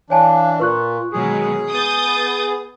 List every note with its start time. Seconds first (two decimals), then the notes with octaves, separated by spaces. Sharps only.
0.10 E3 D4 C#5 F5 G#5 A5
0.60 A#2 F4 B4 C#6 F#6
1.13 B2 D#3 F#3 G#3 G#4
1.70 B3 D#6 G6 A6